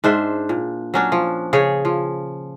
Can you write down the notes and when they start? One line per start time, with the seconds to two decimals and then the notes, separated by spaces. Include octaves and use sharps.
0.04 G#2 D4 C5 E5
0.49 A#2
0.94 F#3 C#4 D4
1.12 F3
1.53 C#3 G#4 C#5
1.85 F3